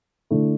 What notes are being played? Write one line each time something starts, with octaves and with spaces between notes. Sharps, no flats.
D3 A3 E4